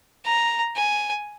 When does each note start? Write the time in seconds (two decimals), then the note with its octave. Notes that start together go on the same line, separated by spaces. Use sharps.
0.25 A#5
0.76 G#5